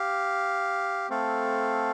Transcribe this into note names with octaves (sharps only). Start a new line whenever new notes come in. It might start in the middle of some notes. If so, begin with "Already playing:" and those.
Already playing: G4 F5
A3 C4 A4 F5